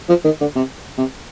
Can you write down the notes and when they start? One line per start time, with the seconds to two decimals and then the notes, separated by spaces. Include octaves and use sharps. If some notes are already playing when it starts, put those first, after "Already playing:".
0.09 F3
0.25 D#3
0.41 D3
0.56 C3
0.98 C3